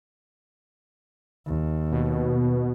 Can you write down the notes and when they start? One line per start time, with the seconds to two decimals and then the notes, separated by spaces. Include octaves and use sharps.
1.46 D#2
1.92 B2